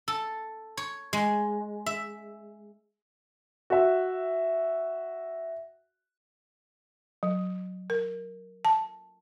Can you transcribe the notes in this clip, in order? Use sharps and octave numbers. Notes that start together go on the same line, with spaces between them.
A4
C#5
G#3
E5
F#4 E5
F#3
A#4
A5